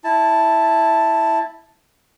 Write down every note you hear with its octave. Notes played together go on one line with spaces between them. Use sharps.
E4 A5